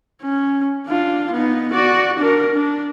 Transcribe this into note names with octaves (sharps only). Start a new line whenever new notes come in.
C#4
D4 F4
B3 D#4
F#4 D5
D4 A#4
D4